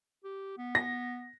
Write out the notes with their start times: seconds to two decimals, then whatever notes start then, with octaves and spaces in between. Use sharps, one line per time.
0.24 G4
0.58 B3
0.75 A#6